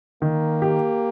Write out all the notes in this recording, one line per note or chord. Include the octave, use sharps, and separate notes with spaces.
D#3 A#3
G4